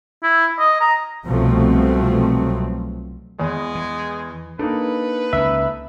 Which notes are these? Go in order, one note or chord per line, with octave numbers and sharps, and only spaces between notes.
E4
D#5
A#5
C2 B2 F3 F#3 A3 C4
E2 G#3
E3
A#3 D4 D#4 A4 B4
C#2 C#4 E5